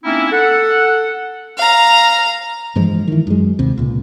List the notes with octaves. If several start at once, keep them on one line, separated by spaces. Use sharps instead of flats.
A#3 C4 C#4 D#4 E4
A4 F#5
F5 A#5
G2 E3 F3 G#3
D#3 E3
F#2 G#3
D#2 C3
C#2 A#2